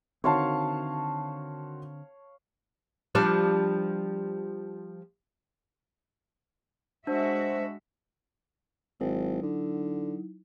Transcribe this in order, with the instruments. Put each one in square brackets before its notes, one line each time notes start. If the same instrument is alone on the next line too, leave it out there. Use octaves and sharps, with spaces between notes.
[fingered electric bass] D3 C4 [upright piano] D#3 F#4 C6 [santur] C#5 F5 A5
[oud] F3 G3 D4
[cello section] G#3 F#4 E5 [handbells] D4 [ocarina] C5
[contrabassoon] G#1 [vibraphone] F#3 D#4 E4
[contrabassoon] D3